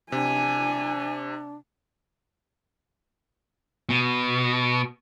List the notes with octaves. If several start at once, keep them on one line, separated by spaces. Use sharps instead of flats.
C3 D4 G#5
B2